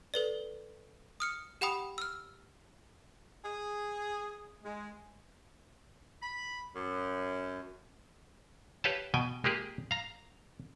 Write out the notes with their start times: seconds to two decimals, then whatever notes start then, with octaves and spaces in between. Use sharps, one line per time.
0.14 A4 B4 D5
1.20 D#6 F6 C#7
1.61 G4 F#5 G5 B5 D#6
1.98 E6 F6
3.44 G#4
4.63 G#3
6.22 B5
6.76 F#2
8.84 G4 B4 C#5 F5 G5 A5
9.14 B2 G5 G#5
9.44 G#3 A#3 G4 G#4
9.91 F5 A#5